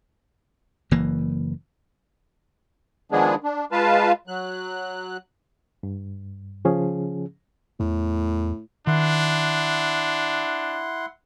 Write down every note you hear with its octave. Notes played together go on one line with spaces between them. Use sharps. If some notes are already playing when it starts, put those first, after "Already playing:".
F#1 E3 A#3
D#3 F3 G#3 B3 D4 G#4
D4
G#3 F4 B4 F5 A5
F#3 F#6
G2
C#3 F3 C#4 G#4
E2 A2
D#3 D4 E4 F#5 C6